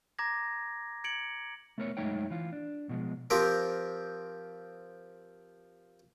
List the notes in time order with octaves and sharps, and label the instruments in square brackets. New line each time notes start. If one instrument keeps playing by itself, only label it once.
[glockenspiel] A#5 D6 G#6 A#6
G#6 C#7 D7 F#7
[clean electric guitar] A3 B3 A#4 C5 C#5
F#2 G#3 A3 D#4 C#5 G5
E3 F4
D4
B2 F3 G#3
[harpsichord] F3 C4 G4 A#4